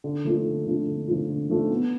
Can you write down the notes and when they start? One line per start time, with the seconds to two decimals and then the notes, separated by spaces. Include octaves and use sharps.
0.04 D3
0.25 F3 A3 D4 F4
0.46 D3
0.66 F3 A3 D4 F4
0.87 D3
1.07 F3 A3 D4 F4
1.28 D3
1.50 F3 A3 D4 F4
1.70 B3